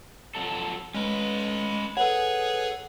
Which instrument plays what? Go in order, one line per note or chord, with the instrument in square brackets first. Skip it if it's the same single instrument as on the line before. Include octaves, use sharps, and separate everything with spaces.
[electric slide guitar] F3 F#3 A4
[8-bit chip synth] G#3 [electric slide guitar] C#4 B4
[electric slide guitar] G#4 [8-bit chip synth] A4 B4 C#5 [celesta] F#5